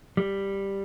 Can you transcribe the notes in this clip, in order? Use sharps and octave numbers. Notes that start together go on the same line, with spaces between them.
G3